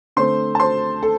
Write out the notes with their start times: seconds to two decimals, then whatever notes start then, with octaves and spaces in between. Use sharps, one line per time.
0.16 D3 A3 C4 C5 C6
0.55 A5
0.60 C5 C6
1.03 A4